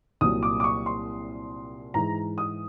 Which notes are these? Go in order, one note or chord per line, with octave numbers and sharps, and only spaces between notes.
C2 A#2 F#3 D#6
D6
D6
C#6
C6
G#2 E3 G#3 A#5
D#6